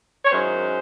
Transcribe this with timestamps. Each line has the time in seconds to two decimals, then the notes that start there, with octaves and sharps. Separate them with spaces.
0.25 C#5
0.31 F#2 D#3 G#3 C#4 E4 C5